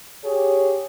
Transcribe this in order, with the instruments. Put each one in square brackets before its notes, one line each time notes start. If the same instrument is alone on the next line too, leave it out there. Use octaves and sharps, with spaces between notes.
[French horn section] G4 G#4 C#5